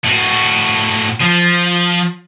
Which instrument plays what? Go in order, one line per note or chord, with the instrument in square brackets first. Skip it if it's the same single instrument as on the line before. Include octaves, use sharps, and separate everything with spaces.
[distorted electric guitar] A2 F#4
F3